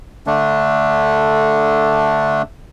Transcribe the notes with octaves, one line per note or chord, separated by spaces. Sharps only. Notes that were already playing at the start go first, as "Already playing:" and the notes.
D3 A3 D4